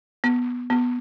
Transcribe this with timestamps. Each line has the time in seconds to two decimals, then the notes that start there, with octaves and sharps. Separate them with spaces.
0.24 B3
0.70 B3